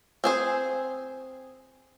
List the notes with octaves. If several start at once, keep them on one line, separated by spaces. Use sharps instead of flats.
C4 G#4 C5